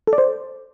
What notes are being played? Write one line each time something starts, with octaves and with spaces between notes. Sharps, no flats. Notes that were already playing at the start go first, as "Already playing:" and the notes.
A4
D5
C5